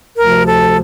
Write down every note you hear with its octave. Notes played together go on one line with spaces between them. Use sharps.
D2 C3 F3 A#4
A4